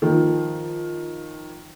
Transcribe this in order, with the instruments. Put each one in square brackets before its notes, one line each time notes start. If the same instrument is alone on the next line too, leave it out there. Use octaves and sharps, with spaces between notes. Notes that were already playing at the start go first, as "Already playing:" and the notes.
[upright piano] D#3 F3